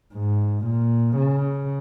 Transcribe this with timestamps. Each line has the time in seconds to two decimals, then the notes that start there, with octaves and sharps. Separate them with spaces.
0.14 G#2
0.66 A#2
1.17 C#3